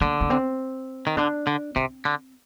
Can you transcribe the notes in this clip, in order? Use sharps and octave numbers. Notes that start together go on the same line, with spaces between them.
D3 A#3
A#3
C4
D#3
D3 D4
D3
C3 C4
D3